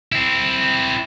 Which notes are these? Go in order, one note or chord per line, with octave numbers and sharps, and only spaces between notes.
C4 E4